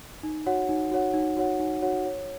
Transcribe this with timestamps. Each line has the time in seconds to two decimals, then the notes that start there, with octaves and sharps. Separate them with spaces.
0.23 D#4
0.46 F#4 C#5 F#5
0.69 D#4
0.91 F#4 C#5 F#5
1.14 D#4
1.37 F#4 C#5 F#5
1.59 D#4
1.82 F#4 C#5 F#5
2.06 C#5